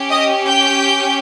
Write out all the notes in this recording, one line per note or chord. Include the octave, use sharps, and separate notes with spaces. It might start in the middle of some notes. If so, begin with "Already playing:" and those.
Already playing: C#4 G4
D#5 D#6
G5 G6